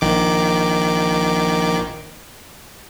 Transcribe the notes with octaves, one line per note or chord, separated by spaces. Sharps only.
A#1 D#3 D6